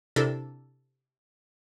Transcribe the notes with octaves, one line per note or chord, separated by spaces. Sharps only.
C3 D4 E4 A4 A#4